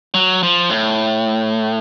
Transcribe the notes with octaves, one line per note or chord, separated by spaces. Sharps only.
F#3
F3
A2